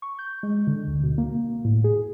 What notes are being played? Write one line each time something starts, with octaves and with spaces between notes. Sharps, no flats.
C#6
G6
G#3
D3
D2
B2
A#3
A2
G#4